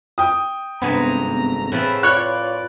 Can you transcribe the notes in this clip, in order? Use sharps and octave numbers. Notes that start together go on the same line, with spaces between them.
G5 D#6
G#1 G2 C3 B3 A4 G#5 A#5
A2 F3 G#4 B4 C#5 E5
F4 C#5 D5 F#6